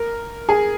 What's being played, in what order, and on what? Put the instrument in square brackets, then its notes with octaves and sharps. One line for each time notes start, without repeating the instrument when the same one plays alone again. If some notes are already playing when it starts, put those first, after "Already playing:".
Already playing: [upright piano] A#4
G#4